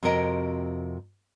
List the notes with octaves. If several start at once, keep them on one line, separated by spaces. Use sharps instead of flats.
F2 C3 F#4 A#4 D#5 G5